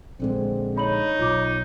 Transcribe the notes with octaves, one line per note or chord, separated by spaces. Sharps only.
A#1 D3 G#3 C4
D#4 C#5 B5 F#7
B1 F4 D6